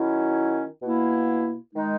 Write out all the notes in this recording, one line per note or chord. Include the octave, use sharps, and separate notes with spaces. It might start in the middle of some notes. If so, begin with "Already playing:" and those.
Already playing: D#3 F#3 C#4 E4
B2 A#3 E4
D#3 G#3 D#4